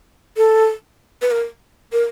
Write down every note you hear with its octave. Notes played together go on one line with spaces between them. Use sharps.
A4
B4
A#4
A#4